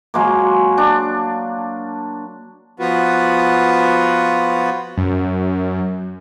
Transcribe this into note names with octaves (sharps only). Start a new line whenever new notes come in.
F#3 G#3 A#3
D4
F3 B3 F4 F#4 B4
F#2